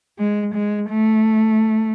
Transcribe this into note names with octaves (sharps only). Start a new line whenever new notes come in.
G#3
G#3
A3